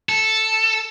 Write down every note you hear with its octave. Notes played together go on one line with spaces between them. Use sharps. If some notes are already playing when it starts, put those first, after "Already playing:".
A4